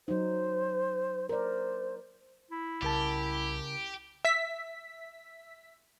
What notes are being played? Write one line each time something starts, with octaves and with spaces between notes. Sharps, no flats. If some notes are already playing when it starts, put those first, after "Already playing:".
F#3 D#4 C5
A#4 C5 D5
E4
C2 C#3 G4 A#4 A5
E5 B6